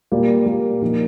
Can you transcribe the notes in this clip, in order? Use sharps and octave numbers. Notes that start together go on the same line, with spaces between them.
A#2 G3 A#3 F4
A#2 G3 A#3 F4
A#2 F3 A#3 D#4